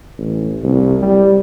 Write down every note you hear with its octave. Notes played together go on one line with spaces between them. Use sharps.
A1
C2
G3